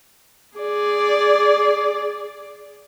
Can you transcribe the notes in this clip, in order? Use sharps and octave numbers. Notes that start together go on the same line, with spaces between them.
G#4 D5